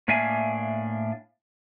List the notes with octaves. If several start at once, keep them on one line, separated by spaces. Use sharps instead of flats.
A2 A#3 D4 E5 F5 G#5